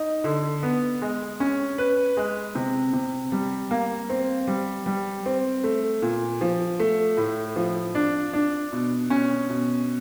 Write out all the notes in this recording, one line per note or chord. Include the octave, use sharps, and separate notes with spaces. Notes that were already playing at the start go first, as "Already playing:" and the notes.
Already playing: D#4
D3
B3
G#3
C#4
B4
G#3
C3
C3
G3
A#3
C4
G3
G3
C4
A3
A#2
F3
A3
A2
F3
D4
D4
B2
C#4
B2